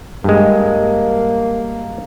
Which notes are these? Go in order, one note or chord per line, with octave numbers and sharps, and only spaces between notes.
G2 G#3 A#3